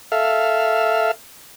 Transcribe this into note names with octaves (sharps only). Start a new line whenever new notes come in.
A4 E5 F5